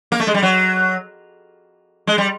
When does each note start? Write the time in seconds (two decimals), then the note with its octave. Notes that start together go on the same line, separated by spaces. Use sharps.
0.12 A#3
0.20 A3
0.27 G#3
0.34 G3
0.43 F#3
2.07 G#3
2.18 G3